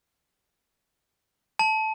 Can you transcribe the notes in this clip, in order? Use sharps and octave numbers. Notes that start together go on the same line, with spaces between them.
A5